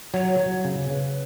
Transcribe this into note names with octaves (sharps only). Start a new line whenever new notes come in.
F#3 C#5
F#3
C#3
C#3 B4